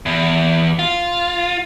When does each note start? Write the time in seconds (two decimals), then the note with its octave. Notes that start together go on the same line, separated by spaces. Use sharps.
0.06 E2
0.79 F4